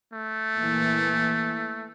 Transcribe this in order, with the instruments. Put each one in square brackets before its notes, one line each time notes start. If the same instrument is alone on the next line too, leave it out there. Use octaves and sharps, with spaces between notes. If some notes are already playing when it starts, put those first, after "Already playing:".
[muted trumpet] A3
[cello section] A#2 E3 A#3